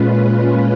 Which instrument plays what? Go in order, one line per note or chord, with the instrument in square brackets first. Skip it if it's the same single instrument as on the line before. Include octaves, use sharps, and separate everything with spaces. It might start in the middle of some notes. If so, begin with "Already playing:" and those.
Already playing: [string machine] A#2 G#3 C#4 F4 B4